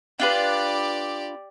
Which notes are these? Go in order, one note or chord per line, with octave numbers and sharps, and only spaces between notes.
D4 F4 G4 B4 D5